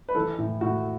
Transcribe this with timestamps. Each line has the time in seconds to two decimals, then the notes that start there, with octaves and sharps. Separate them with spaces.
0.09 B4
0.15 E3 A4
0.38 A2
0.61 A2 F#4